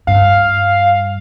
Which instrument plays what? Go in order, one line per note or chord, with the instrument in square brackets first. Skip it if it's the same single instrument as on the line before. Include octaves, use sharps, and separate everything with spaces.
[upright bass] G2 [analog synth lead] F5